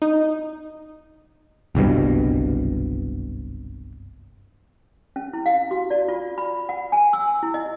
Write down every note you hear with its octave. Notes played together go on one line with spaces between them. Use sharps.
D#4
F#1 C2 G2 B2
C#4
E4
F5
F#4
D5
F4
B5
F#5
G#5
E6
E4
D#5